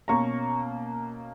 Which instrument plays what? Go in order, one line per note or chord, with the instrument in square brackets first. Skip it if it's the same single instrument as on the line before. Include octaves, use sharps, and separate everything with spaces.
[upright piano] B2 A#3 C#4 A#5 C#6